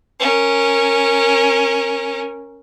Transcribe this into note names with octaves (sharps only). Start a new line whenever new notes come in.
C#4 A#4